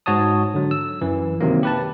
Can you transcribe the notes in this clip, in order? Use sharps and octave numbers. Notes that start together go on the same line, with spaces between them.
G#2 F#4 C#5 A5 D#6
D3 F#3
E6
F#2 E3
C3 D#3 F#3 A#3
G4 B4 A5